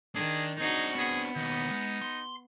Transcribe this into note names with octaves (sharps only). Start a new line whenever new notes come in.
D#3 D4 G#4
C4 D4 D#4 F#4 G#4
B3 G#4
D#2 B2 D#4
G#3
C6